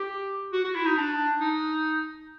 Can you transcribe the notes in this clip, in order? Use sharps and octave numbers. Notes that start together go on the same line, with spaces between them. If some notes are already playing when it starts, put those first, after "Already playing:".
Already playing: G4
F#4
F#4
E4
D#4
D4
D#4